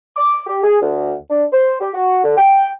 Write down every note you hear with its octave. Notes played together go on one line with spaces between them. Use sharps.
D6
G4
G#4
D2
D4
C5
G4
F#4
D3
G5